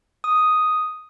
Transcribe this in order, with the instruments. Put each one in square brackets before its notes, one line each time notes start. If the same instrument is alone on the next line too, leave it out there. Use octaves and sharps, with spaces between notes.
[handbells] D#6